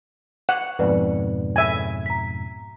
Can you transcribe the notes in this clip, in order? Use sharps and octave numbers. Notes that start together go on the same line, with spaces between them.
F#5
F2 G#2 B2 B4 D5
E5 G#5
A#5 B6